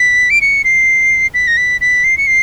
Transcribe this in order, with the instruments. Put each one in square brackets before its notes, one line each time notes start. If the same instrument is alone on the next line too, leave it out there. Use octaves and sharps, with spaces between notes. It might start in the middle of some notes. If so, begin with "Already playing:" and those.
Already playing: [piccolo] B6
D7
C#7
C7
B6
A#6
B6
B6
C7
C#7
C7